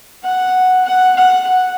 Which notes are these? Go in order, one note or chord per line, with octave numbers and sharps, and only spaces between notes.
F#5
F#5
F#5
F#5